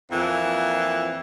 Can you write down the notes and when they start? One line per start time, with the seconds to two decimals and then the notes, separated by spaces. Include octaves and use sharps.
0.11 F2 A#2 E3